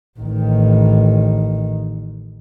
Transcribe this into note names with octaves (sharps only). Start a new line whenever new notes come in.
A1 D#3